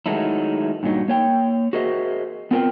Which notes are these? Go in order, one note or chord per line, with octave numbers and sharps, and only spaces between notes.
D#3 F#3 G#3 A3 D#4 E4
G2 A#2 F#3 D#4
A#3 C#5 G5
F#4 G#4 A#4 C5 D#5 E5
B3 C4 F4 A#4 B4 G5